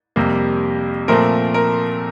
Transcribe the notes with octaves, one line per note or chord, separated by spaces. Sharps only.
F2 C3 G3 A#3
A#2 F3 A3 C4 A#4
A#4